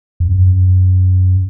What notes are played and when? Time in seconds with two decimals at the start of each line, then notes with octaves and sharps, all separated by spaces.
0.20 F2
0.27 F#2